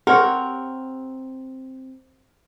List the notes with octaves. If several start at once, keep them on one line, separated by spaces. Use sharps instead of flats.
C4 G4 A#4 C#5 F#5